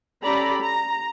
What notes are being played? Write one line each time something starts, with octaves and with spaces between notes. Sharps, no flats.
C#4 G4 A4 D5 A#5 B5
A#5